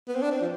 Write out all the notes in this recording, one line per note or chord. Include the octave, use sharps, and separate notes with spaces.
B3
C4
D4
C4
F3